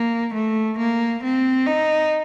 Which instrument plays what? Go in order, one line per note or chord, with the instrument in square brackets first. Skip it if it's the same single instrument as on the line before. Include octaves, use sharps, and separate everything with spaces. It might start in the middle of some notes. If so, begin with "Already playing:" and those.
Already playing: [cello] A#3
A3
A#3
C4
D#4